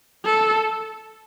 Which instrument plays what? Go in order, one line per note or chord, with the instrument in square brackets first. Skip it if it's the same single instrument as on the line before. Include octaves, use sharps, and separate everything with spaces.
[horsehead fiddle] A4